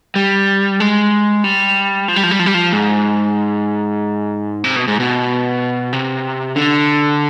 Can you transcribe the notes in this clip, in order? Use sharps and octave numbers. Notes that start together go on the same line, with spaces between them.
G3
G#3
G3
F3
G3
F3
G3
F3
G3
F3
G#2
C3
B2
G#2
B2
C3
D3